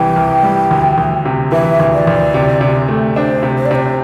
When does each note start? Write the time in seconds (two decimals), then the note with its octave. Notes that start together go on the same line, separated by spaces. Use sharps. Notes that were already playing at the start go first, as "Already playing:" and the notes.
Already playing: C2 C3 E3 G3 G5
0.16 C2
0.43 G3
0.71 D2
0.98 D2
1.25 C3
1.52 E3 E5
1.80 D2
1.93 D5
2.07 D2
2.34 C3
2.61 C3
2.88 A3
3.16 D4 C5
3.43 C3
3.57 C5
3.66 D5
3.71 C3 C5